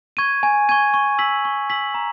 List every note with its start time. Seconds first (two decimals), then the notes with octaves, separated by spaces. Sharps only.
0.17 C#6 G#6 D#7
0.43 G#5
0.69 C#6 G#6 D#7
0.94 C#6
1.18 E6 B6 F#7
1.45 C#6
1.70 E6 B6 F#7
1.94 A#5